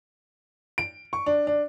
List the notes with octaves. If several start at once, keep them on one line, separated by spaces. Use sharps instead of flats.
D7
C#6
D4
D4